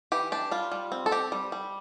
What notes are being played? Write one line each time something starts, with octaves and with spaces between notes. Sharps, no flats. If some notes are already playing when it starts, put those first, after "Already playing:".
E3 G4
D4 G4
G3 F4
G3
C4
A4
C4 G4
G3
G3